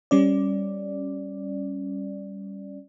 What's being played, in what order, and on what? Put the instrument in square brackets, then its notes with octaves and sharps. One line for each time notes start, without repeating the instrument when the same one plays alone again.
[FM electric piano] G3 C#4 D5